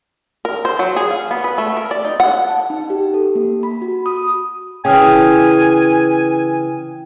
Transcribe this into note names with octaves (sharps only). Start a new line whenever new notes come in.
A#4
C5
F#3
G#4
F5
B3
B4
A3
A#4
D5
D#4
F#5
A5
D#4
G4
A4
A#3
B5
F#4
D#6
C#3 E3 G5 G#5 D#6 F6